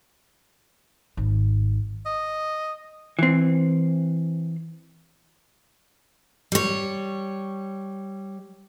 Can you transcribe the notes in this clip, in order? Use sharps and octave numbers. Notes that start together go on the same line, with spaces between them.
G#1
D#5
E3 C4
G3 C#5